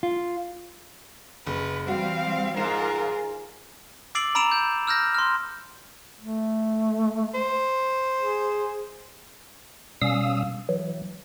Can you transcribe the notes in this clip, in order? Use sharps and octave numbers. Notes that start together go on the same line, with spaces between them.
F4
F#1 B4
E3 G3 C4 F#4 F5
G#2 F4 A#4 C7 E7
D6 E6 A6 C7 D7 F#7
A#5 B5 E6 D7 E7 F7
G6
E6 F6 G6 A#6
C6 F6
A3
C5
G#4
B2 G3 C#4 F5 D#6 E6
E3 F#3